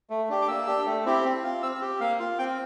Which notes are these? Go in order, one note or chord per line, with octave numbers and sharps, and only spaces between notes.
A3
D4 G4
D6
A#3 E6
D4 G4
A3
C4 E4 G4
C4
F4
C4 E6
E6
G4
A#3 F5
F4
C4 G5